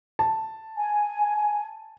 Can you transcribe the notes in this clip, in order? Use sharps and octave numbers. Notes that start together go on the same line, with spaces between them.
A5
G#5